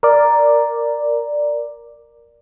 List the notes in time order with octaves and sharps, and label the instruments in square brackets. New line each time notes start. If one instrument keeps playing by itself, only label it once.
[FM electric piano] A#4 D5